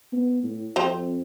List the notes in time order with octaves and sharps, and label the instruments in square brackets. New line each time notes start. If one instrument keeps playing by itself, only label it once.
[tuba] B3
A2
[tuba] F2 [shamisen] C4 C5 A#5